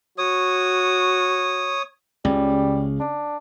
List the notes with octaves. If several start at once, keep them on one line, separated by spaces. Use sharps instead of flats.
F#4 C#5 D#6
C#2 C#3 G3
D4